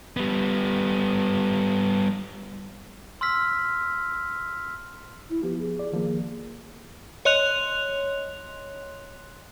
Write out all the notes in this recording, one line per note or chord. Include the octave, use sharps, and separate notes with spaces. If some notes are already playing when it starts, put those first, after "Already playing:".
G3 B3
C6 E6 F6 B6
E4
F3 B3 G4
G#4
D5
D#3 F3 A#3
C#5 D#5 C6 F#6 F7